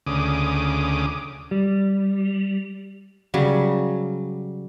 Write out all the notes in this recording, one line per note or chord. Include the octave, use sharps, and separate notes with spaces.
D2 C#3 D6 D#6
G3
C#3 F#3 G3